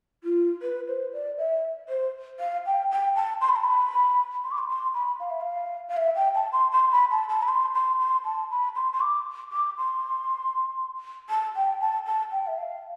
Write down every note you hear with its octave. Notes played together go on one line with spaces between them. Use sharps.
F4
B4
C5
D5
E5
C5
F5
G5
G5
A5
C6
B5
A5
B5
C6
D6
C6
C6
B5
F5
E5
F5
F5
E5
G5
A5
C6
C6
B5
A5
A5
B5
C6
C6
C6
A5
B5
C6
C6
D6
D6
C6
A5
G5
A5
A5
G5
E5
F5